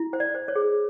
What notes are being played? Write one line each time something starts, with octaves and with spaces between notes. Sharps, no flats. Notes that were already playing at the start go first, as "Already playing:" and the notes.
Already playing: E4
C5
D5
C5
C#5
G#4